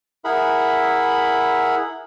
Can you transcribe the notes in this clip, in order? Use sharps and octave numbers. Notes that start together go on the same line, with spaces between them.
E4 G#4 A#4 E5 F#5 B5